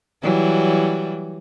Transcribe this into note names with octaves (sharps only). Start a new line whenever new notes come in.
E3 F#3 G3